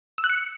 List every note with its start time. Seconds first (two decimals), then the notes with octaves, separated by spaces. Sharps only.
0.18 E6
0.24 F#6
0.30 C#7